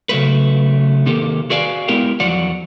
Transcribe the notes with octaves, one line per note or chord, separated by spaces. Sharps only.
C#3 F#3 A3 B4
C3 D#3 A#3 G4 A4
F#4 G#4 B4 D5 F5 G#5
G#3 B3 E4 G4 A#4 G5
E2 F3 F#3 D5 F#5